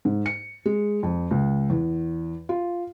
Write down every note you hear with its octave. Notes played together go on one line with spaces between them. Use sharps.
G#2
C#7
G#3
F2
C#2
E2
F4